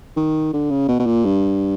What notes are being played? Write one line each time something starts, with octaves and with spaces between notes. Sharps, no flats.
D#3
D3
C#3
B2
B2
A#2
G2